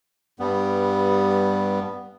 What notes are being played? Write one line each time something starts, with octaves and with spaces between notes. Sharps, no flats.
G2 G3 B3